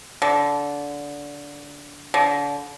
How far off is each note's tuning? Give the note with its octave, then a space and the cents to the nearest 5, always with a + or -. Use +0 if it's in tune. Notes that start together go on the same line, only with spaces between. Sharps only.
D3 -20
D3 -35